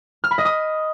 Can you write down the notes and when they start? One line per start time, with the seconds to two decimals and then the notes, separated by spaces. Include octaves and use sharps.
0.24 F6
0.31 B5
0.38 D#5
0.45 D#6